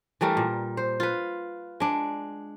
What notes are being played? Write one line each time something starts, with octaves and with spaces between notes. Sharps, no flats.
E3 G3 A3 A#4
A#2
C5
F4 B4
G#3 D4